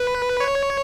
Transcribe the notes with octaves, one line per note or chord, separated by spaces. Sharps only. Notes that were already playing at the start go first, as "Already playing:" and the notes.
Already playing: B4
C#5